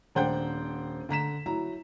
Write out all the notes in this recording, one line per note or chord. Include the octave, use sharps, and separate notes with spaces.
D#1 D4 C5 F#5 G5 G6
D3 A#5 B6 E7
F#3 E4 A#5